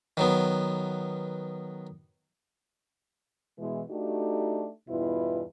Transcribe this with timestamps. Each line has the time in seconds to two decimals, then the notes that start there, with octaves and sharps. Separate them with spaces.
0.17 D#3 F#3 B3
3.58 B2 E3 G#3
3.89 A3 D4 D#4 F#4 G4
4.89 E2 G2 B2 E4 F4 B4